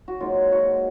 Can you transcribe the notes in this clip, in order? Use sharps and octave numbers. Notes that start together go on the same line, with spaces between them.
F#4
G#2 F#3 A#3 F4
F#4